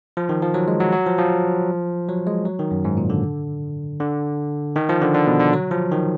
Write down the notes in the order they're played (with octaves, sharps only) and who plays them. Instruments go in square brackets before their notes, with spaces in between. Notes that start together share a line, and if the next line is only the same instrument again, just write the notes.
[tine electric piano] F3
D#3
F3
F#3
G#3
F#3
F#3
F3
F3
F#3
G#3
F#3
D#3
F#2
G#2
A#2
D3
D3
D#3
F3
D3
D3
B2
D3
F#3
F3
D#3